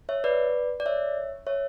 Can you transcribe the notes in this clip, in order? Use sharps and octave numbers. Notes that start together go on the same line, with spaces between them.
C#5 E5
B4 D5
D5
C#5 E5
C#5 E5